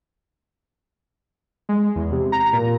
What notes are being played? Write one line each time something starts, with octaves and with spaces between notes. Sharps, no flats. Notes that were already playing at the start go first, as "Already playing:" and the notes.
G#3
E2
C3
A#5
A#2